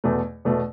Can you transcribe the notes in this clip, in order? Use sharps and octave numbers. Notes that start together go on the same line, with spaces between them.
E2 B2 A3
E2 B2 A3